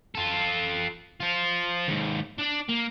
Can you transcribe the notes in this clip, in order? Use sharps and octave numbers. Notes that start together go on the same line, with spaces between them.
F4 A4
F4 C5
D#2 G#2
D4 D5
A#3